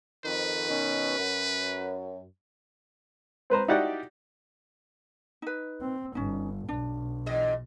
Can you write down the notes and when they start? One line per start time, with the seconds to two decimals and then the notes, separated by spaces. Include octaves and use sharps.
0.25 F2 D#3 B4
0.69 B2 D#3 C#4
1.17 F#2
3.50 C4 B4 C5 A#5
3.68 D#4 E4 F#4 G4 D5 F#5
5.42 D#4 B4
5.81 C4
6.15 G1 G2 C#4 D#4
6.69 B1 D4
7.26 E2 A#2 D#5